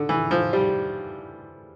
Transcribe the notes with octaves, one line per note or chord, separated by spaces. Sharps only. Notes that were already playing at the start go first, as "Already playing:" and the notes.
Already playing: D3
E3
F3
G3